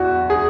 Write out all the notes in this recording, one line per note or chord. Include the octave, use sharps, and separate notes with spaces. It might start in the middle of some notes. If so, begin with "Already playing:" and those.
Already playing: E2 E3 F#4
G#4